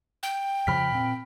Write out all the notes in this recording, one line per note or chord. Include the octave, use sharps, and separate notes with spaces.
G5
F2 C#3 F3 B5 F6 B6
A#2 C4